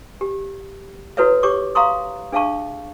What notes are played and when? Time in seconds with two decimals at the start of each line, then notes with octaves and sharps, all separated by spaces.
0.21 G4
1.17 E4 F#4 A4 B4 C#5 E5
1.43 G4 C#5 C#6 D6
1.75 E5 F5 A#5 C6 C#6 D#6
2.32 D4 G#4 E5 F5 A5 C#6